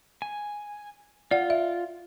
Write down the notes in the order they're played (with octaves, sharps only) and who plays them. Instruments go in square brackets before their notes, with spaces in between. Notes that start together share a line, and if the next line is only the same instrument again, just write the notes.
[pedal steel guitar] G#5
[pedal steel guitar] F4 [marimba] D5 F#5
[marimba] E5